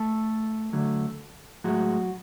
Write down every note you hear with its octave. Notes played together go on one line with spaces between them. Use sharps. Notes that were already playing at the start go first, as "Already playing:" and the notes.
Already playing: A3 A4
D3 F#3 A3
A2 F#3 G#3 F#4